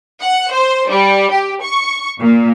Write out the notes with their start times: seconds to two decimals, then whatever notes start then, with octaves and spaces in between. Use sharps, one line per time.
0.22 F#5
0.52 C5
0.89 G3
1.31 G4
1.62 C#6
2.20 A#2